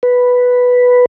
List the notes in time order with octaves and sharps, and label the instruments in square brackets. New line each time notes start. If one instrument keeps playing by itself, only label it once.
[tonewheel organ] B4